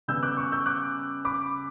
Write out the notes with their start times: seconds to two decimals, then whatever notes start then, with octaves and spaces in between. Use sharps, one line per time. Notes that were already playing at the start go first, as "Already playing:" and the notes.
0.08 C#3 G3 B3 E6 G6
0.23 D6 F#6
0.37 C#6 E6
0.52 E6 G6
0.66 D6 F#6
1.25 B5 D6